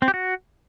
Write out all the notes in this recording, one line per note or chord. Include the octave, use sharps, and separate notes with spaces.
C4
G4
F#4